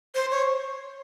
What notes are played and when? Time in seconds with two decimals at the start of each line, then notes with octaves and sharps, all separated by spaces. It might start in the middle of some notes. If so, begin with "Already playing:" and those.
0.15 C5
0.31 C#5